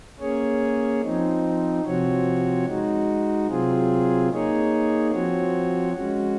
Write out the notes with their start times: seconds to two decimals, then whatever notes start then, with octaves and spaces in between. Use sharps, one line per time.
0.20 A#3 C#4 G#4 C#5
1.02 F3 C4 D#4
1.84 C3 F3 C4 F#4 C#5
2.66 G#3 D#4 F#4
3.48 C3 F#3 C4 F4 G#4
4.30 A#3 D#4 G#4 C#5
5.11 F3 C4 F#4 C#5
5.93 G#3 C#4 F#4